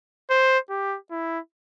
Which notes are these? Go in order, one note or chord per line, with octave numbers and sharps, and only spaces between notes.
C5
G4
E4